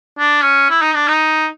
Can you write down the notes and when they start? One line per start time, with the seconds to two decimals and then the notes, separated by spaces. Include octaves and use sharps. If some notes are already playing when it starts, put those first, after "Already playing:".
0.18 D4
0.44 C#4
0.70 E4
0.81 D#4
0.95 D4
1.08 D#4